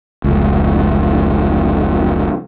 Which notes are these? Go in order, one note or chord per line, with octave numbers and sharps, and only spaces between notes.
F1 C#2